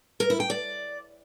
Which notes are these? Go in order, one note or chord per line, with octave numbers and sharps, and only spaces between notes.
A#4
E4
G5
D5